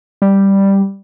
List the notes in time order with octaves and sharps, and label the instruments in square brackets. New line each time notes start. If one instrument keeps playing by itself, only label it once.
[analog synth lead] G3